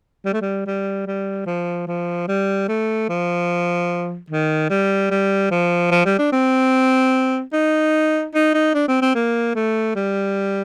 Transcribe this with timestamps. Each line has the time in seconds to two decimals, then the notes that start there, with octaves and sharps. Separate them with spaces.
0.25 G3
0.33 A3
0.41 G3
0.66 G3
1.06 G3
1.46 F3
1.87 F3
2.28 G3
2.68 A3
3.09 F3
4.30 D#3
4.70 G3
5.11 G3
5.51 F3
5.91 F3
6.05 G3
6.18 D4
6.32 C4
7.53 D#4
8.34 D#4
8.54 D#4
8.74 D4
8.88 C4
9.02 C4
9.15 A#3
9.55 A3
9.95 G3